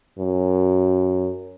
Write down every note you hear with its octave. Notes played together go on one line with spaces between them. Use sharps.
F#2